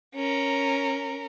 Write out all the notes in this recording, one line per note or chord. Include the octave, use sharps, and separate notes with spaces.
C#4 A#4